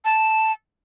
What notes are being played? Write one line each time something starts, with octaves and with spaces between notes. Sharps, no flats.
A5